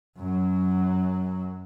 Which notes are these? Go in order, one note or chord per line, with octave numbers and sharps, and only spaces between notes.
F#2 F#3